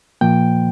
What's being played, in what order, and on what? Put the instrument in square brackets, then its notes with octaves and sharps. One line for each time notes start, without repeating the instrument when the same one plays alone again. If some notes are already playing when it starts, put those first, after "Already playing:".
[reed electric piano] A#2 F3 A#3 G5